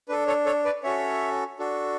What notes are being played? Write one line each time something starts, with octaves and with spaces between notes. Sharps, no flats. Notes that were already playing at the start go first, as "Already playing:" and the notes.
D4 A4 B4
A4 C#5
A4 C#5
B4 D5
C#4 F#4 A4 C#5 E5
D4 F#4 A4